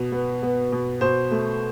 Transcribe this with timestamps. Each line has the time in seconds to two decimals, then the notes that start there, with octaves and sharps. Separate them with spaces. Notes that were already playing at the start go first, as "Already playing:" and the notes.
Already playing: B2
0.12 B3
0.43 B3
0.72 B2
1.01 B2 C5
1.31 A3